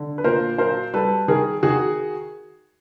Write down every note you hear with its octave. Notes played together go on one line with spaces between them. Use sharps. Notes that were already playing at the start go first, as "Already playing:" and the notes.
Already playing: D3
B4
A#2 A#4 C5
F#3 A#4 C5
G3 A4 B4
D#3 G#4 A#4
D#3 F#4 G#4